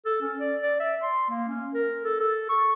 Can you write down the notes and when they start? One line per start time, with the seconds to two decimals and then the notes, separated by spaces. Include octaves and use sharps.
0.05 A4
0.21 C#4
0.40 D5
0.62 D5
0.80 E5
1.03 C6
1.30 A#3
1.48 C#4
1.74 A#4
2.04 A4
2.20 A4
2.49 C#6